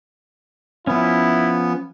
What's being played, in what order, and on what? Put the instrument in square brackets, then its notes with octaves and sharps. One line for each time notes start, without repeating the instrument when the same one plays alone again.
[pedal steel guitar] F3 C#4 [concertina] B3 [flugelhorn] E4